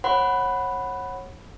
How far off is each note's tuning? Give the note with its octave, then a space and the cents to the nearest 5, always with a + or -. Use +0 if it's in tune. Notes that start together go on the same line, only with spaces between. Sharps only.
C#5 -30 F#5 +0 B5 +0